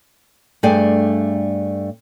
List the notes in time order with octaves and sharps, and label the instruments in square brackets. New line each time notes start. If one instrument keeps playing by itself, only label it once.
[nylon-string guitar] G2 A3 D4 G#4 D5 G5